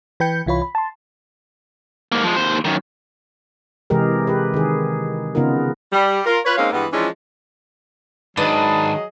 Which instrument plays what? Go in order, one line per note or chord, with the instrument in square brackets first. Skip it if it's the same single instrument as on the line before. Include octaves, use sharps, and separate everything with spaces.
[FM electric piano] E3 B4 G5 G6 C#7
C2 E3 F4 C#5 B5
B5
A5 C6
[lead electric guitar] G#2 A#3
F3 G#3
D#2 C5
F#2 D#3
[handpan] C3 E3 G#3 G4 G#4 A#4
G4 B4
D#3 G#4
C#3 B3 D#4 F4 A#4
[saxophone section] G3
F4 A#4
F4 B4 C#5
G#3 A#3 C4 C#4 D#4 F5
G2 E3 G#3 B3
E3 F3 G#3 C#4 D4
[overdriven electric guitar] G#2 D#3 [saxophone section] F#3 G#4 D#5 [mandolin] D4 B4